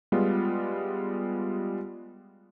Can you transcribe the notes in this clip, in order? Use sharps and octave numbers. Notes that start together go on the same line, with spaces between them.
G3 G#3 B3 F4